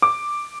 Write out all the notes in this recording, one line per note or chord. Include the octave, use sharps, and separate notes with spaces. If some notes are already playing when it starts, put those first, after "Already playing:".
D6